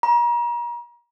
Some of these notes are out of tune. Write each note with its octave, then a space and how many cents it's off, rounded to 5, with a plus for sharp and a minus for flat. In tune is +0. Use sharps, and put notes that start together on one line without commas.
A#5 +40